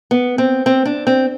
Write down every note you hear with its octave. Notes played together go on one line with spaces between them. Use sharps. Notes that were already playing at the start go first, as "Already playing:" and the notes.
B3
C4
C4
D4
C4